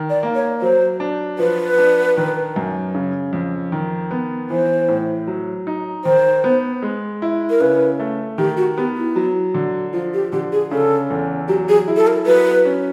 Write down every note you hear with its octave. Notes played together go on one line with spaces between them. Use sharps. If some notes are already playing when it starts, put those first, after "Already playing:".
Already playing: D#3
D5
A#3
C#5
F#3 C5
D4
F3 B4
D4
D#3
F#2
C#3
F2
D#3
B3
E3 C5
A2
F#3
D#4
D#3 C5
B3
G#3
E4
A#4
C#3 B4
A3
D#3 G4
F#4
B3 G4
E4
F#3
D3
F3 F4
G4
D3 G4
G#4
C#3 A4
E2
F#3 G4
G#4
E4
A4
A#4
F#3 B4
C#4